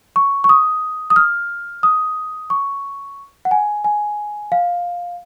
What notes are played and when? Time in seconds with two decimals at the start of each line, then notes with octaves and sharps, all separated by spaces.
0.16 C#6
0.44 C#6
0.49 D#6
1.10 D#6
1.16 F6
1.83 D#6
2.50 C#6
3.45 F#5
3.51 G#5
3.84 G#5
4.52 F5